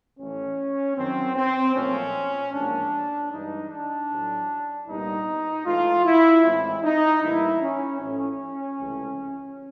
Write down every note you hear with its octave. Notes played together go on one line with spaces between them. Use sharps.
A1 A2 E3 C#4
F#2 D#3 F#3 C4
C4
B1 A#2 F3 A3 C4 C#4
A1 G#2 F3 A#3 D4
G2 E3 G#3 D#4
D4
A1 A2 F#3
C2 A#2 G3 B3 D#4
G#2 E3 A3 F4
E4
A1 A2 E3 G#3 C4 E4
D#4
A2 E3 G3 A#3 E4
C#4
A1 A2 F3 A3 C#4
C#2 C3 E3 A3